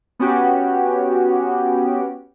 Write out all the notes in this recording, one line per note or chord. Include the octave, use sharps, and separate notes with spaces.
B3 C#4 F#4 G4